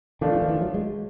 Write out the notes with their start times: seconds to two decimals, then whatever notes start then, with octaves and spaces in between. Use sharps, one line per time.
0.21 D#3 F3 A3 D4 F4
0.35 E3
0.42 D#3
0.48 E3
0.62 F#3
0.74 G#3